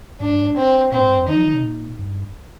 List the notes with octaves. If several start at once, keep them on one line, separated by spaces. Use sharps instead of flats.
G#2 D4
G2
G#2
C4
A#2 C4
G#2
G2
F2
D#3 D#4
F3
D#3
C3
A#2
G2